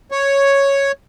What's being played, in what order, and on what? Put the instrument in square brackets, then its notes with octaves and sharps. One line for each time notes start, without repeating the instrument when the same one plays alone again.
[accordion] C#5